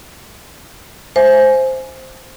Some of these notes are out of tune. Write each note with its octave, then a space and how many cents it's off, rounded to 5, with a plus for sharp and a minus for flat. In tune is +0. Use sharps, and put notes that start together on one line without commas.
C5 +0 E5 +0 G#5 +10